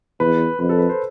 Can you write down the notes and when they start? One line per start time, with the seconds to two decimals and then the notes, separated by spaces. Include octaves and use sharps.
0.20 E2 B4
0.59 F2 B4
0.69 A4
0.79 B4
0.89 C5